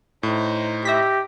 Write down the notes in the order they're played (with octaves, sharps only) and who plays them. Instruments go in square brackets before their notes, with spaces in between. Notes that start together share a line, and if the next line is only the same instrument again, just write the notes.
[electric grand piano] A2 [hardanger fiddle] D#4 C5
[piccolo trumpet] G4 [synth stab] E5 A#6 B6